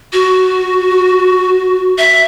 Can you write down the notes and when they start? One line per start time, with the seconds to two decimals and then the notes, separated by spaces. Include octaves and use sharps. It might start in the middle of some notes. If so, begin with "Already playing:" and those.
0.13 F#4
1.98 E5